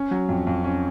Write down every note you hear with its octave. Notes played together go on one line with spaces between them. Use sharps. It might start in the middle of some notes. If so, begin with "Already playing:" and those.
Already playing: C#4
F#3
F2
F2
C#4